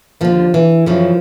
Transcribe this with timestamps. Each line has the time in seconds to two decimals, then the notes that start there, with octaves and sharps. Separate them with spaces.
0.21 D#2 D3 F3
0.54 E3
0.86 F#2 C#3 E3 F3